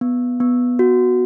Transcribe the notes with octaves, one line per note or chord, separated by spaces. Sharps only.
B3
B3
F#4